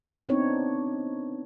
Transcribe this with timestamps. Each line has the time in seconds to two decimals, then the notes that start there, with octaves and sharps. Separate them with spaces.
0.29 B3 C4 D4 D#4 C#5